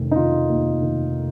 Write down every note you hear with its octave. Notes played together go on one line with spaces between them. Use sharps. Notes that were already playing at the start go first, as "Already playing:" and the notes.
Already playing: F1 D#3
D#4
D#3 F4
D#2
D#3